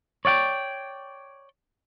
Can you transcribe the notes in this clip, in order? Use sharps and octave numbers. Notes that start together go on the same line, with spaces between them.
C#5 D5 F#5 G5